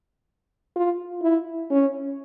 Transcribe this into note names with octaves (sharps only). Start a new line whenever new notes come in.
F4
E4
C#4